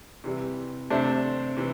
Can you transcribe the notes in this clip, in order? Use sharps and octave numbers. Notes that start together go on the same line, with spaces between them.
C3 E3 G3
C3 A3 D4 C5 E5
C3 E3